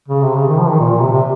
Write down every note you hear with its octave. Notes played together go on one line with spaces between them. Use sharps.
C#3
C3
C#3
D#3
F3
D#3
A#2
A#2
C3
C3